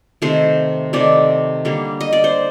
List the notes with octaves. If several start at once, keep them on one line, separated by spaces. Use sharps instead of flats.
C3 D#3 A3 C5
C3 D#3 A3 D5
D3 G3 A#3
D#5
D5
C5